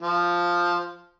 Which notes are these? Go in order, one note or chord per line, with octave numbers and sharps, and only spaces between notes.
F3